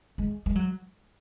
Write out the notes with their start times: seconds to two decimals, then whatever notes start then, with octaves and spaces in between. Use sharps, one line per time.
0.18 G#3
0.46 G#3
0.55 F#3